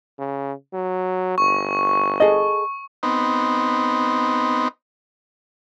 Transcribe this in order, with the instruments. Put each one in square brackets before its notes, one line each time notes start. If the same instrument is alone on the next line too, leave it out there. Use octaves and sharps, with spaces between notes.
[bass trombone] C#3
F#3
[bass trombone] G1 [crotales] C#6
[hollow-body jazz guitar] G#4 A4 D#5
[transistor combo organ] B3 C4 D#4